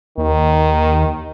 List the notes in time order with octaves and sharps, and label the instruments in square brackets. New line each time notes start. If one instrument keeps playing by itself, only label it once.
[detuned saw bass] D#2 [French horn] D#3